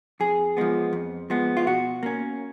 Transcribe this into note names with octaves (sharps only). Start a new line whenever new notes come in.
F2 G#4
F3 G#3 B3
F2
F3 G#3 B3
F4
B2 F#4
A#3 C#4